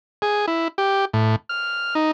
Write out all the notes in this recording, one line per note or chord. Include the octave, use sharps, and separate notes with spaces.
G#4
E4
G4
A2
F6
D#4